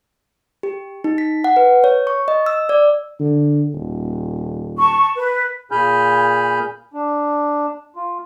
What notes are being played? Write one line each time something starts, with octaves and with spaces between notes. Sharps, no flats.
G4
D#4
B6
F#5
B4
C#5
C#6
D#5
E6
D5
D3
D#1
A5 C#6
B4
A#2 G#4 G#5 B5 F6 G6
D4
F4